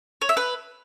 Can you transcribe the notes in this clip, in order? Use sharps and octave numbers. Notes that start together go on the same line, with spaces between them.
C#5
E5
B4